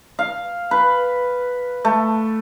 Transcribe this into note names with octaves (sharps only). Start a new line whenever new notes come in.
F5
B4
A3